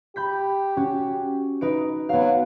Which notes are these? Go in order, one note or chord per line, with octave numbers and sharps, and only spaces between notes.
G4 B5 G6 B6
C#4 F#4
D#4 B4 D7
F#3 B3 F5